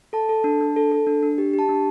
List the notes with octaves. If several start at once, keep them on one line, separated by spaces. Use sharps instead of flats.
A4 A5
A4
D4
D4
A4
A4
D4
D4
G4
G4
A5
D4